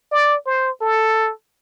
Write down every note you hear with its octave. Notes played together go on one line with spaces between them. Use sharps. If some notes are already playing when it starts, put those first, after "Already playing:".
D5
C5
A4